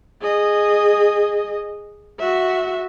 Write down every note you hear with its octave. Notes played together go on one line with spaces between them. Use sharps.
G#4 D#5
F#4 E5